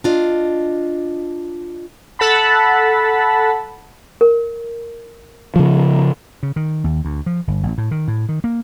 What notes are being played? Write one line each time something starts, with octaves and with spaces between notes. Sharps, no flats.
D4 F4 D#5
A4 F#5 A5 B5
A#4
C#3 F3
C#3
D#3
D#2
D2
F3
G1
A1
A2
D#3
A2
D#3
A#3